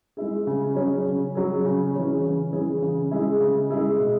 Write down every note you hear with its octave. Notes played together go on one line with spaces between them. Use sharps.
G#3 E4 G#4
C#3
F#3 C#4 G#4
C#3
F#3 C#4 G#4
C#3
E3 C#4 G#4
C#3
E3 C#4 G#4
C#3
G#3 E4 G#4
C#3
G#3 E4 G#4
B2